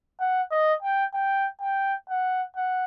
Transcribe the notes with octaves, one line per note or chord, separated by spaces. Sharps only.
F#5
D#5
G5
G5
G5
F#5
F#5